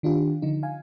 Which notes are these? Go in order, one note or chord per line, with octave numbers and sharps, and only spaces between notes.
D#3 D4 F4 G4
D3 F3 D#4
F5 G#5